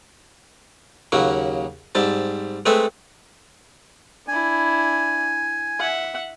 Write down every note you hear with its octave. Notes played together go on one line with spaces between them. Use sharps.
D#2 C#3 F#3 A#3
G#2 G3 C4 A5
G#3 A3 C4 A4 B4 E5
D4 E4 G#5
E5 F#5